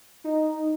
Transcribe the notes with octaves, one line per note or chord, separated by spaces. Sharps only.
D#4